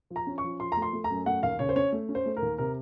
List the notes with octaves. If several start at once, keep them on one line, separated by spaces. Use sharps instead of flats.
F3
A#5
C#4
C#6
F3
F3 C6
A3 A#5
C6
A3
A#5
F#2
A3 F#5
D#2 F5
C#3 C#5
C5
C#4 C#5
A3
C#4
C5
A3
A#4
D#2
C3 A#4